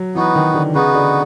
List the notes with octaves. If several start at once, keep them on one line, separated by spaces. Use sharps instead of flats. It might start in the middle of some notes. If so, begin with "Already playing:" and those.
Already playing: F#3
E3 B3 D#4 F#4 B4
D#3
D3
C#3 B3 D#4 F#4 B4
D3